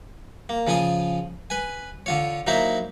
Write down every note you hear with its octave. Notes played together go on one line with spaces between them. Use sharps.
A#3
C#3 F3 F4 G#5 D#6
B4 G#5
D3 F4 C#5
F#3 A#3 D#4 E4 C5 E5